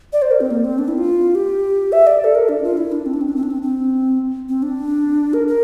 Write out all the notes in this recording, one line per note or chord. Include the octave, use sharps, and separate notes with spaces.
D5
C5
A#4
C4
A#3
C4
D4
E4
F4
G4
E5
D5
A4
A#4
D4
F4
E4
D4
C4
D4
C4
D4
C4
D4
C4
C4
C4
D4
A#4
A#4